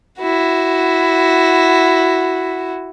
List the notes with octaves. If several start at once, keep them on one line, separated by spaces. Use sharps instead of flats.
E4 F#4